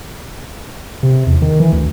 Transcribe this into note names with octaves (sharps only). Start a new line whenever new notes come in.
C3
E2
D#3
E3
D2